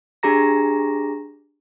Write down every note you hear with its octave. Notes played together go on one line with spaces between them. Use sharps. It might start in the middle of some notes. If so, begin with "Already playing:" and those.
D4 G4 G#4 A#5 A#6